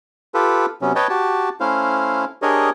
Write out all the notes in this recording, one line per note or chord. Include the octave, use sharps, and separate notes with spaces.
F4 G4 A4 B4
C3 F#3 B3 C#4
B4 C#5 D#5 G5 A5
F#4 G4 A5
A3 C#4 E4 C5 F5
D4 G4 G#4 A#4 C#5 D#5